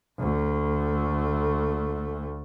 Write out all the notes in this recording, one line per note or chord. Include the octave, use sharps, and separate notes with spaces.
D2 A3